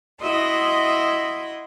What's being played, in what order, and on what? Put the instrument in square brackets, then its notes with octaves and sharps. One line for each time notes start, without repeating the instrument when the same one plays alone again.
[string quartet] E4 F#4 D#5 E5 C6 D#6